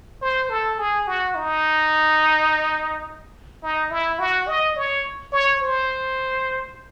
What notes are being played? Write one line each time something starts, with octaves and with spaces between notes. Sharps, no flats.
C5
A4
G#4
F#4
D#4
D#4
E4
F#4
D#5
C#5
C#5
C5